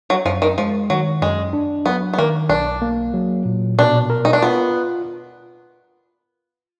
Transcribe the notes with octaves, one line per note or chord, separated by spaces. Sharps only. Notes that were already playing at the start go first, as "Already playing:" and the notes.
F#3
F#2 F3
D#3
F3 G#3
D#3 F#3
F#2 G#3
D4
F#3 B3
B3
D#3 A#3
B1 D4
A#3
F#3
A#2
B2 D4
A#4
D#4
D4
B3 F4